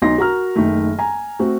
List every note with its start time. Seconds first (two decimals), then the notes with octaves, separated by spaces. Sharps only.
0.02 B1 D#4 C6 A#6
0.18 F#4 A#4 A#5 F6
0.56 F#1 D#3 A3
0.99 G#5 A#5
1.39 A3 C4 F#4